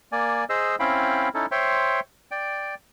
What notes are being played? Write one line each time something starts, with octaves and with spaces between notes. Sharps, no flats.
A#3 D5 G#5
G#4 C5 D#5 E6
C4 C#4 E4 F5 G5 B5
C#4 D#4 E4 A4
C5 C#5 E5 G5 C6
D5 G5